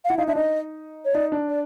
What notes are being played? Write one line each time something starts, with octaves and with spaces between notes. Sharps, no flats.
F5
E4 F#5
D#4 F5
D4 E5
D#4 D#5
C#5
D#4 D5
D4
D5